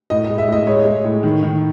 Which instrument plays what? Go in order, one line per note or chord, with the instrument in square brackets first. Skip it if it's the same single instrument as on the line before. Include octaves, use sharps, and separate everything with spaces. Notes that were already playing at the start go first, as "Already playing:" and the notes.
[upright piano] A2 D#5
D#5
G#3
E5
A2 D#5
G#3 C#5
G#3
A2
D#3
D#3